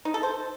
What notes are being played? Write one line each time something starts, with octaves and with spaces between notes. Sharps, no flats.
D#4
A4
C5